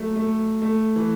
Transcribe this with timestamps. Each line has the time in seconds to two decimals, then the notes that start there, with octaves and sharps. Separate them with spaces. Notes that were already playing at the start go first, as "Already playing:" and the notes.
Already playing: F#3 A3
0.16 A3
0.62 A3
0.96 E3